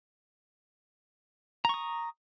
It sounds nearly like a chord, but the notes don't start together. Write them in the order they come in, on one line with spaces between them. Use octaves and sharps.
A#5 C#6 D#6